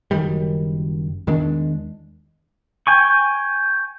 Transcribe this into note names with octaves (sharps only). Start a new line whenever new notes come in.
F#1 F#2 D#3 G3
E2 D#3 G#3 D4
G5 G#5 C#6